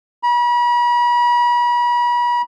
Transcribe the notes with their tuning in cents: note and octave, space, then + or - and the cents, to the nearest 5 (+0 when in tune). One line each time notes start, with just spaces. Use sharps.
B5 -40